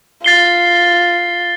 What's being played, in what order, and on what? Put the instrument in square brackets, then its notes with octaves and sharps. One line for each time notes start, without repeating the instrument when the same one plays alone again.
[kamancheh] F4 [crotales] A6 C7 G7